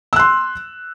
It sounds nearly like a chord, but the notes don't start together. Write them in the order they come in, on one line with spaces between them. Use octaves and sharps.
E6 F#6 C6